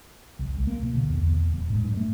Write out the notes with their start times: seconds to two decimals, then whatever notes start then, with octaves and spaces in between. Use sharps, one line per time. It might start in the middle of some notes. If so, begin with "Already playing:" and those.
0.39 C2
0.54 C#2
0.67 A#3
0.83 B2
0.96 D3
1.09 E2
1.23 E2
1.37 E2
1.54 D#1
1.70 G#2
1.84 G2
1.97 A3